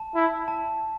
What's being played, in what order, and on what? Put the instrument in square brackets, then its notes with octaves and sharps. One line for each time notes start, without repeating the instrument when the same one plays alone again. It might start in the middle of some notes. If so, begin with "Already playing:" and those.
Already playing: [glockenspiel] A5
[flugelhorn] E4
[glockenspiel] A5